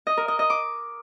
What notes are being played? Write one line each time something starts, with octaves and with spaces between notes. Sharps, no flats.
D#5
A#4
D#5
D#5
D6